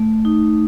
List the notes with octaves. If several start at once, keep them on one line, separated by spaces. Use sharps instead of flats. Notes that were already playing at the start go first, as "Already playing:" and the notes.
Already playing: A3
D#4